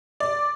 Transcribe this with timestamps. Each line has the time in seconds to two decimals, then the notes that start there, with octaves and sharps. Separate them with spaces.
0.20 D5